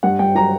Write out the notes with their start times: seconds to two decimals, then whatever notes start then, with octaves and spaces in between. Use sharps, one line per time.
0.03 G2 F#5
0.19 G2 G5
0.35 F#3 A#5